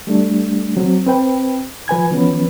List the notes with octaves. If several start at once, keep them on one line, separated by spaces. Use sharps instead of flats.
G3 A3 D4
F#3 C4
C4 B4 G5
F3 B4 G#5 G#6
E3 F3 B3 C#4 B4